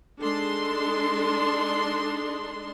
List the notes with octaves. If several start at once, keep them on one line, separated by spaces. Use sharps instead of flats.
G#3 D4 D#4 A4 C6